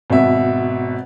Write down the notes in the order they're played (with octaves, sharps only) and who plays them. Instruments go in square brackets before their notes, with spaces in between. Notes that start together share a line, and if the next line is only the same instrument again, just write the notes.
[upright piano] G#1 B2 E5